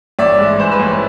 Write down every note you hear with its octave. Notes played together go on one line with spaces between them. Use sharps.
A1 D5 E5
G#2
E3 C5
B4
A1